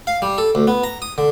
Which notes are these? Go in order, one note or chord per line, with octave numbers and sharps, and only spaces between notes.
F5
G3
A4
D2
B3
A#5
D#6
D3